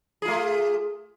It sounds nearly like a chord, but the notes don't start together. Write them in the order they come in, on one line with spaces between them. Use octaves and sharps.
G#4 F4 A3